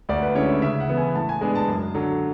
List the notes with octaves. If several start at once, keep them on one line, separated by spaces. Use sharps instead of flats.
D2 D5
B4
D3 G#3 C#4 E4 C#5
E5
C#3 E5
F#5
E3 B3 E4
G#5
A2 A5
G#5
G#3 B3 D4 G#5
A5
F#2
D3 F#3